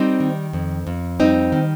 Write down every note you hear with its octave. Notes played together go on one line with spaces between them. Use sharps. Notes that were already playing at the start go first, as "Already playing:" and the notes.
Already playing: G3 C4 D#4
D#3
F2
F2
G3 C4 D#4
D#3